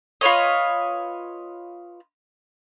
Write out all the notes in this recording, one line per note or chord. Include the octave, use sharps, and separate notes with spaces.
F4 B4 C#5 D#5